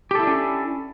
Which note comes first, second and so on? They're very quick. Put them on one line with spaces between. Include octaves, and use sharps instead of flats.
G4 A4 E4 D4 C#4